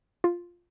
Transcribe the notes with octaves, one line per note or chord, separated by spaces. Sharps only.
F4